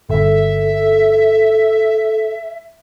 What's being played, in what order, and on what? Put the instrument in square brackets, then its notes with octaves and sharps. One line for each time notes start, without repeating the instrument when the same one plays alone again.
[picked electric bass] G1 [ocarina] A4 [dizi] E5